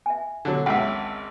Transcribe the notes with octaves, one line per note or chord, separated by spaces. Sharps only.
E5 G#5
D3 F#3
G#1 C#2 E5 F#5 G5